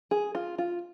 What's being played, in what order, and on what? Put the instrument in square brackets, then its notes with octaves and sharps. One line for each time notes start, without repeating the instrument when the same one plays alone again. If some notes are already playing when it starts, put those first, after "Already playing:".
[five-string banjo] G#4
F4
F4